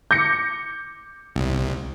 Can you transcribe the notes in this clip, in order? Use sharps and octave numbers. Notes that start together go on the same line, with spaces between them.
D6 G6 A#6 C#7
C2